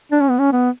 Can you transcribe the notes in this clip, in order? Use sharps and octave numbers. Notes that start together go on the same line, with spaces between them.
D4
C#4
B3
C#4
B3